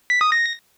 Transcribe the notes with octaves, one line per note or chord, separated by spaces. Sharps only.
B6
D#6
A#6